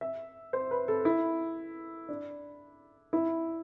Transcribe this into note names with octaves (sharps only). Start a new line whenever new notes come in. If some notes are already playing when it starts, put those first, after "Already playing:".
E5
C5
B4
A4
E4
D4
E4